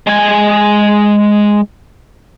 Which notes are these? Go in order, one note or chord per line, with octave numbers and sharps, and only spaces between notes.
G#3 G#5